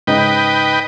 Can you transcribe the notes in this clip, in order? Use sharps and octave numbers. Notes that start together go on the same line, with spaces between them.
G#2 C#3 D#4 B4 D#5 G5